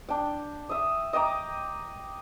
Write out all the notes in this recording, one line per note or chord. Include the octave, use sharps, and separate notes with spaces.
D4 G5
E5 D#6
D#5 G5 A#5 D6